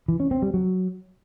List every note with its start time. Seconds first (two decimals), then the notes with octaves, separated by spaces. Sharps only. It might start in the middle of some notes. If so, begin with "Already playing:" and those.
0.08 E3
0.20 C#4
0.31 C4
0.42 G3
0.54 F#3